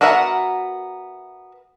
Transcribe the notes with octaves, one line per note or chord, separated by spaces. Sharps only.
B3 F#4 A#4 E5 F#5